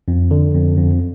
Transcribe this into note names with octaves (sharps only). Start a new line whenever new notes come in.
F2
D3
F2
F2